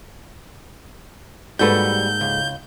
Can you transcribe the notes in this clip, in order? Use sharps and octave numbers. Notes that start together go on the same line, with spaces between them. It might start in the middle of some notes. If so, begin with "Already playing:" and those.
G#2 G3 A#3 F#4 A4 B4 G6
C#2